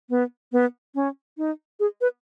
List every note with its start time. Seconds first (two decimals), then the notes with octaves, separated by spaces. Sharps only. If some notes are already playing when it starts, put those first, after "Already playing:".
0.10 B3
0.52 B3
0.95 C#4
1.38 D#4
1.80 G#4
2.01 B4